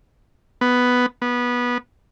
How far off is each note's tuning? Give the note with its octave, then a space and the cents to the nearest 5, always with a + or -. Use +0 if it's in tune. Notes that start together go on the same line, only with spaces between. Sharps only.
B3 +5
B3 -15